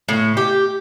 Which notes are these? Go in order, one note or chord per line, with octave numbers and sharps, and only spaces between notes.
A2
G4